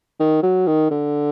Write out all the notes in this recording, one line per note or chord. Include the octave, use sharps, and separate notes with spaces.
D#3
F#3
D#3
D3